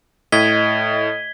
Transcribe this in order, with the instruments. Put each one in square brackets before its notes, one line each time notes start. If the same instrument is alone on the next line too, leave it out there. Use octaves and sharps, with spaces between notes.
[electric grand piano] A2 [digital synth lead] D#5 [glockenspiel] G#6 B6 G7